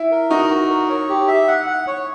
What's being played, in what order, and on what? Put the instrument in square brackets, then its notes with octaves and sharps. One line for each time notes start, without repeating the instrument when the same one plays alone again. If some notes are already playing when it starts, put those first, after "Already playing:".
Already playing: [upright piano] E4
[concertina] A#4
[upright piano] D#4 [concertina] F#4
[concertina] F#4
A#4
C#5
G4
E5
F#5
F#5
C#5